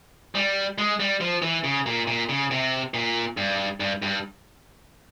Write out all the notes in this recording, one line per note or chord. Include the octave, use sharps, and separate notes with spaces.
G3
G#3
G3
F3
E3
C#3
A#2
A#2
C#3
C3
A#2
G2
G2
G2